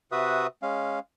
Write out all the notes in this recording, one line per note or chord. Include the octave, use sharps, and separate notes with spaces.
C3 F#4 B4 E5 D#6
G#3 C#4 F5